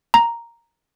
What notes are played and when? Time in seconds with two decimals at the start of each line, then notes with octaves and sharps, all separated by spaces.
0.14 A#5